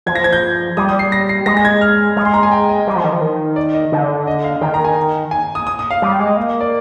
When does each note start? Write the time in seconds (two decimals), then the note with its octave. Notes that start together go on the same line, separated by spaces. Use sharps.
0.06 F3 G#6
0.15 A#6
0.24 G#6
0.33 G6
0.77 G3 D#6
0.89 D#6
0.99 C7
1.12 A#6
1.29 C7
1.46 G#3 A#6
1.57 A#6
1.65 G#6
1.81 F6
2.16 G#3 F6
2.25 C6
2.34 A#5
2.43 G#5
2.52 G5
2.69 D#5
2.87 G3
2.96 F3
3.04 D#3
3.13 F3
3.21 D#3
3.56 D5
3.74 D#5
3.92 D3
4.27 D#5
4.44 F5
4.61 D#3 G5
4.74 A#5
4.85 G#5
5.31 G#5
5.55 D#6
5.67 D#6
5.79 D#6
5.91 F5
6.02 G3
6.20 G#3
6.37 A#3
6.61 D5